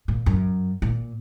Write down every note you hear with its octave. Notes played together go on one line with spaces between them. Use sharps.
A#2
F#2
A#2